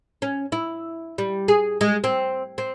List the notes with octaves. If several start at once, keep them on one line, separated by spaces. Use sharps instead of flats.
C#4
E4
G3
G#4
G#3
C4
C4